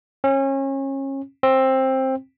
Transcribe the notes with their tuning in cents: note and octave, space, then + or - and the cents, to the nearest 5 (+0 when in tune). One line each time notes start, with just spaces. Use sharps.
C#4 -30
C4 +15